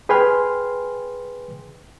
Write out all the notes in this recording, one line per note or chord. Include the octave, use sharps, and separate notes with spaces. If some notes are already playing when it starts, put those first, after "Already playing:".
G#4 B4 G5 G#5 C6 F6